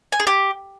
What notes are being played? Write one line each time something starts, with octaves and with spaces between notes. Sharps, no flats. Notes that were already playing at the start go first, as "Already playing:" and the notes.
G#5
G#4
G4